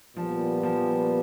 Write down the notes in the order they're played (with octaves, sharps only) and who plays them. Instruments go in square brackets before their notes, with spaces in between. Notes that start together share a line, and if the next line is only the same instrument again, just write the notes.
[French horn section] A#2 G3 B3 [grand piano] F3
[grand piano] F3